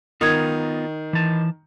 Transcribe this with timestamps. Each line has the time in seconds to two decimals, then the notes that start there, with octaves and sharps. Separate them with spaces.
0.21 D#3 B3 D#4 F4 D#6 G#6
1.13 E3 A5